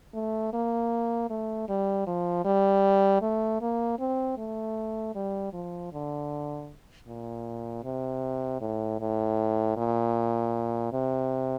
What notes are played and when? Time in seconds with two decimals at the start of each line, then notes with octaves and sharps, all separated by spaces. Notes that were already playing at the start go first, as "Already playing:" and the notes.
0.14 A3
0.53 A#3
1.30 A3
1.69 G3
2.07 F3
2.45 G3
3.22 A3
3.61 A#3
3.99 C4
4.37 A3
5.15 G3
5.53 F3
5.92 D3
7.07 A#2
7.84 C3
8.61 A2
9.01 A2
9.77 A#2
10.93 C3